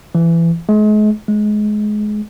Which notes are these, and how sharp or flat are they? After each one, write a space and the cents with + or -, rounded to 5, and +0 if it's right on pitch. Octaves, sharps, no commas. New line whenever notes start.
E3 +25
G#3 +40
G#3 +25